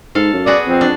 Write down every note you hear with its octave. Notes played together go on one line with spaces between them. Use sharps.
G#2 A4 F5
F#2
B3 F#4 G#4 D5
F2 C4
D4